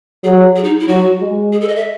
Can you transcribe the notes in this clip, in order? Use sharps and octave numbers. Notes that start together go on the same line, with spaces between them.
F#3 G#4
G#4
D#4
E4
F#3 F#4
G#3
G#4
A4
D#5
E5